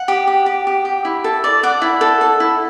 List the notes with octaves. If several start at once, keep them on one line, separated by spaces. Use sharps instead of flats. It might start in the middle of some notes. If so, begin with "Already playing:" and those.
Already playing: F#5
G4
G4
G4
G4
G4
E4
A4
D5
D5 F#5
E4
A4
A4
E4